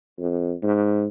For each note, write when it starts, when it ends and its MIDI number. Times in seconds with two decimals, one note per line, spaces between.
0.19 0.53 41
0.63 1.07 44